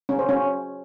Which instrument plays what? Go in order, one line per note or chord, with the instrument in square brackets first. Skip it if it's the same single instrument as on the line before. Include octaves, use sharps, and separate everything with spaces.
[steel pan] C#4
C5
C#4